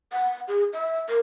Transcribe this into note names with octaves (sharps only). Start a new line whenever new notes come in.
F#5
G#4
E5
A#4